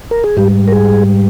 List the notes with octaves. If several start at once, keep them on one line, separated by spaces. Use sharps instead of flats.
A#4
G#4
G#2 G3 G4
A#4
G#4